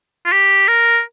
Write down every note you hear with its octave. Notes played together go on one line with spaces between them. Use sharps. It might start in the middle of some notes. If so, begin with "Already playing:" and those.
F4
G4
A#4